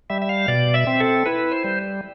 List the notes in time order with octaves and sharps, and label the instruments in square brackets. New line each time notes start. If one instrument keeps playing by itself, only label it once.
[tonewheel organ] G3 E5
E5
F5
B2 D5
E5
C4
A4
E4 B4
C5
G3